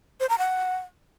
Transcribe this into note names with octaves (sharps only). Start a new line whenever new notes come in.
C5
A#5
F#5